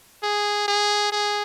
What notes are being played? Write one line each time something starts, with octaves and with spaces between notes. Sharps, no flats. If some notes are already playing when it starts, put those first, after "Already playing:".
G#4
G#4
G#4